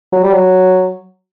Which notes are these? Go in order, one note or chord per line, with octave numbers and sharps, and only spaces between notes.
F#3
G3
F#3